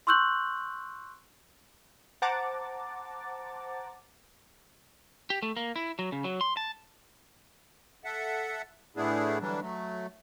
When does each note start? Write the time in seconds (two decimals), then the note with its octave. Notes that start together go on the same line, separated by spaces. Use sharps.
0.07 C6 C#6 E6 F#6 G6 F#7
2.22 C5 F#5 A5 A#5 D6 A6
5.30 G4
5.42 A3
5.57 A#3
5.76 E4
5.99 F#3
6.12 C#3
6.24 F#3
6.41 C6
6.57 A5
8.04 A4 E5 F#5
8.96 A2 A3 B3 D4 E4 G#4
9.40 D3 E3 F#3 G3 D4
9.61 F#3 A3